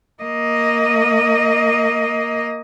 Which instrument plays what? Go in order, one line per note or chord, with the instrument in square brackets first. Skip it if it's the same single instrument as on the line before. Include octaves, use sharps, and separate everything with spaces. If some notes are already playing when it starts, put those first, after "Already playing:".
[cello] A#3 D#5